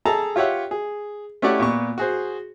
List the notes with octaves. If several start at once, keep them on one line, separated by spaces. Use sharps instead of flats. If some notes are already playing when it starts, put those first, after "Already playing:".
G#4 A4 A5 A#5
F4 G4 C#5 E5 F#5
G#4
A3 C#4 E4 G4 D5 F#5
A#2 B3 C#6
F#4 G#4 C5